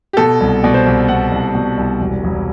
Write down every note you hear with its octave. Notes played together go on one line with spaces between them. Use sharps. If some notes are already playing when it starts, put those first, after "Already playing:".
G4
B2 A4
C2
B2 D5
C5
C2 D5
B2 F#5
C2
B2
C2
E1
E1